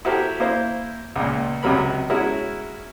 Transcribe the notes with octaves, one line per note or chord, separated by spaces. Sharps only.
E4 F#4 G4 A4 A#4 C5
A#3 E4 C5
C#2 A#2
C#2 C3 F#3 A#4 B5
G#3 C#4 E4 F#4 A#4